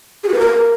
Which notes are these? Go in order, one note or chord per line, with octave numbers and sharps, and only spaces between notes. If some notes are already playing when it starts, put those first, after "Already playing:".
G#4
F#4
B4
A#4